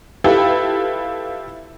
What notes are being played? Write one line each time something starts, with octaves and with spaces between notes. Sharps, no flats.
E4 F4 G4 A4 B4